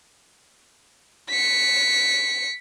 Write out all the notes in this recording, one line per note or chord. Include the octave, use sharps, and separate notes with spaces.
B6 C#7